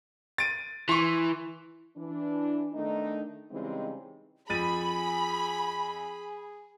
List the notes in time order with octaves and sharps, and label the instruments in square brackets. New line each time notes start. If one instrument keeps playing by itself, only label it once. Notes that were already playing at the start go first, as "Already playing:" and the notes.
[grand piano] A6 D7 D#7
[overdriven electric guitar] E3 [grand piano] C6 C#6
[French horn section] E3 D4
D#3 A3 B3 D4 D#4
C#3 E3 G3 G#3 C4 D#4
[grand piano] F2 A6 D#7 [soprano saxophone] G#4 [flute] G#5 [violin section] B5